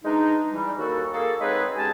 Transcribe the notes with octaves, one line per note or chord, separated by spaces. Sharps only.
E3 G#3 D4 D#4
E3 G3
D#2 F#4 A4
A#3 G#4 A4
F#3 G#3 C4 D#4 G#4 B4
B2 G#3 C#4 G4 G#5 A5